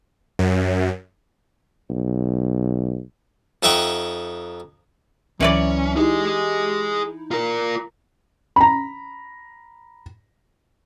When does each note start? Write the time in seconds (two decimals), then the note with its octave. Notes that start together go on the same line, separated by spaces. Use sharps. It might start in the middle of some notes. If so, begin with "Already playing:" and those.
0.39 F#2
1.90 B1
3.63 F2 D#4 E5 F#5 G5 C#6
5.40 C#2 E3 F#3 C#4 B4 D5 E5 C#7
5.97 D#4 E4 G4 G#4 D#5
7.31 F4 A#4 A#5
8.56 A#5 B5